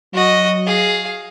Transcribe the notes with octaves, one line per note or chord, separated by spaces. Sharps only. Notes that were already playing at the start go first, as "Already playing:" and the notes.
F#3 F#4 D#5
G#4 F5